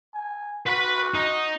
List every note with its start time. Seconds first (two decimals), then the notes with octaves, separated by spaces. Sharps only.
0.14 G#5
0.67 F#4 B4 B5
1.14 D#4